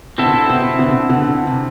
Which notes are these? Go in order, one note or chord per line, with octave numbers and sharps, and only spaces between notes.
B2 D3 C4 E4 A4
B2
C3
B2 D3
B2 D3
C3